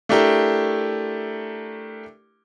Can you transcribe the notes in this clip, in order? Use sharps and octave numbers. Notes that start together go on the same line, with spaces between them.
A3 D4 E4 G4 A#4